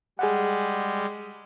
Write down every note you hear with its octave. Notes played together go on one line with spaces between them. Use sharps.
G3 G#3 G#4 F#5